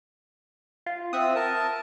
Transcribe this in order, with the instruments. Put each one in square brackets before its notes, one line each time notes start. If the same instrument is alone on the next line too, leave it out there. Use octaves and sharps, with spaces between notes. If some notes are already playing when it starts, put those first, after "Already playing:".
[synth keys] F4
[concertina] C4 [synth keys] E5 F#5 D#6
[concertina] A#4 A5